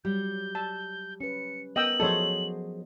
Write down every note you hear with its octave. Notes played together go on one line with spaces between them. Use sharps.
F#3 G3 G6
A5
C#4 B4 C#7
B3 A#4 D#5 G5 E6 F#7
F3 F#3 G#4 A4 C5 C#5 D#5